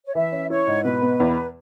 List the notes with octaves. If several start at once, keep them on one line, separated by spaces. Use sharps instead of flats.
C#5
E3 E5
C#4
E4 C#5
G#2
B2 B4
B3
E2